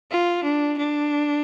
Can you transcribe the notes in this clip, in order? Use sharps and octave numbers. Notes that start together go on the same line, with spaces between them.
F4
D4
D4